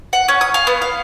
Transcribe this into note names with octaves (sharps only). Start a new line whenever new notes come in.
F#5
C#4
D#6
F5
B3
F5